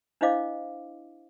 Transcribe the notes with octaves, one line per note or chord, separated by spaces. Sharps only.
D4 E4 C5 D#5 F5 D6